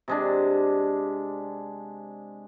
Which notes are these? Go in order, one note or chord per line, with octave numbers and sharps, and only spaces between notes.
C3 G#3 D4